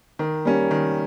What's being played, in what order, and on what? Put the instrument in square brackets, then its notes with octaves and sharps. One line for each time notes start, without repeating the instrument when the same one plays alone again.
[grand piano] D#3
G3 A#3 C#4
D#3